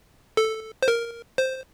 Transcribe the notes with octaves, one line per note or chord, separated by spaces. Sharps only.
A4
C5
A#4
C5